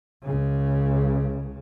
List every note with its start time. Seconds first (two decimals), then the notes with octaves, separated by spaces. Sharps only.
0.23 C#2 C#3